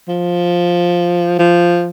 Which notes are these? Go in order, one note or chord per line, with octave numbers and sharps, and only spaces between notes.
F3
F3